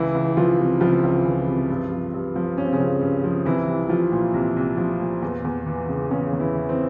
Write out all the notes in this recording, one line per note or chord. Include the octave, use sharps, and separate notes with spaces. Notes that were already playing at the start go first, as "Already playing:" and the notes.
Already playing: C#2 E3 E4
C#2
E3 F3 F4
C3
C#2 F3 F4
C#2
E3
C3
G2
F3
G2
F3
G2 C#4
C4
C#3 C#4
F3
G2
F3
C2 E3 E4
C2
F3 F4
A#2
C2
C2
F3
A#2
E2
E2
E3
C#3
E2 C#3 C#4
E2
E3 E4
E3
C4